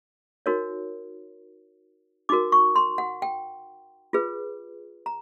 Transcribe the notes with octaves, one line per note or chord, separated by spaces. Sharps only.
D#4 F#4 A#4 C#5
D#4 F#4 A#4 D6
C#6
C6
F#5
G5
F4 G#4 B4
A#5